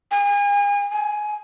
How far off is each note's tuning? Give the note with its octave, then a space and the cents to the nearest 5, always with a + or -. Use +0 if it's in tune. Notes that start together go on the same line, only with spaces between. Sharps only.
G#5 -35
G#5 +20